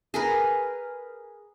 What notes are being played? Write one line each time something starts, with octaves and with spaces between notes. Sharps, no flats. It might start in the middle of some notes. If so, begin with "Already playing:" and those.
G#4 A#4 B4